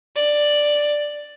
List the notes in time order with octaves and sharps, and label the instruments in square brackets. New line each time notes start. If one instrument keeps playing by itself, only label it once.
[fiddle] D5